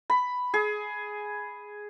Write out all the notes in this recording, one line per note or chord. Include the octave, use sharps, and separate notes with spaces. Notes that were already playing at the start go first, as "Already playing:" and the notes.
B5
G#4